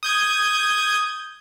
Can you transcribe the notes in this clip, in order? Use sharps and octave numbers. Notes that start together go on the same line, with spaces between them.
D#6 G6 G#6